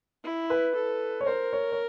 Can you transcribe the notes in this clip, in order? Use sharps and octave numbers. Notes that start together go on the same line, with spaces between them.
E4
B4
A4
C#5
A#4 C5
C#5
C#5